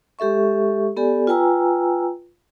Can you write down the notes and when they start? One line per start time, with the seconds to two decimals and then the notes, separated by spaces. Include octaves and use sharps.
0.19 G#3 G4 A4 E5 C#6
0.97 B3 G4 A4 D5 G#5
1.27 F4 B4 G5 G#5 A#5 E6